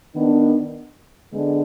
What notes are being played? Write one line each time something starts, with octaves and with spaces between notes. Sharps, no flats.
D#3 B3 D4
D3 G#3 B3 D4